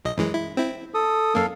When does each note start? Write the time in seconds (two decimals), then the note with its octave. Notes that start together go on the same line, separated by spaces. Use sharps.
0.05 B1 D#5
0.17 F#2 E3 G#3
0.34 E4
0.57 C4 E4
0.94 A4 D#6
1.35 F#2 A#3 A4 F5